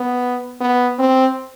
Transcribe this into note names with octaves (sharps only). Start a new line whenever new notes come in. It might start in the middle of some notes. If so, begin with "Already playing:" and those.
Already playing: B3
B3
C4